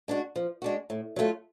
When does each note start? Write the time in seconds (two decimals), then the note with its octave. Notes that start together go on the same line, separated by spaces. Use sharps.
0.08 G#3 D4 F#4
0.36 F3
0.62 G#3 D4 F#4
0.90 A2
1.16 F#3 A3 F4